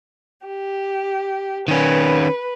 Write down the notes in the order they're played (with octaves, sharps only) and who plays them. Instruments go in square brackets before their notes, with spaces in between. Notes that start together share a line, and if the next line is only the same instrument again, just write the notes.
[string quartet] G4
[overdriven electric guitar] D#3 C#4 [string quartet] B4